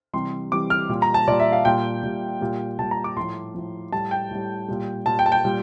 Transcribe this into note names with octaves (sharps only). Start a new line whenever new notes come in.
C3 E3 G3 C6
C3 E3 G3 D6
F6
A#2 G3
A#5
A5
A#2 G3 D5
E5
F5
A#2 G3 G5
A#2 G3
A#2 G3
A#2 G3 A5
A#5
D6
A2 F3 C6
A2 F3
A2 G3 A5
G5
A2 G3
A#2 G3
A#2 G3 A5
G5
A5
G5
A#2 G3